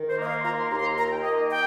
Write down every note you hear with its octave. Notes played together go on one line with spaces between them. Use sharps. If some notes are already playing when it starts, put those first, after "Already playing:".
Already playing: D#3
C5
A#3 D#5
F5
C6
F4 A#5
C6
D#2 A#5
C6
A#5
D#3 A#5
G5
A#3 D#5
D#5
G5